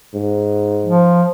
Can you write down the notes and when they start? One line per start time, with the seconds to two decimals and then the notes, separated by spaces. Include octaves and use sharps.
0.14 G#2
0.85 F3